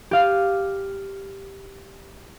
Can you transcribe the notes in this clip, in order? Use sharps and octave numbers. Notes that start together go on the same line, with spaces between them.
G4 F5